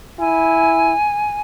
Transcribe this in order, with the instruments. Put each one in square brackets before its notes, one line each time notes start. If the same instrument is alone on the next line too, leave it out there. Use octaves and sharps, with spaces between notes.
[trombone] E4 [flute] G#5